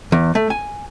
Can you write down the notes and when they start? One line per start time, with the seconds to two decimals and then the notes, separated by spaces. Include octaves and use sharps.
0.12 E2
0.35 A3
0.50 G#5